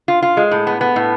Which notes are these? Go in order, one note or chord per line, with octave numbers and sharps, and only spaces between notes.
F4
F4
G#3
A2
B3
B3
A2